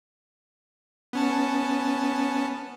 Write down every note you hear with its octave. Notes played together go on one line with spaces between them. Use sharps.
B3 C#4 A5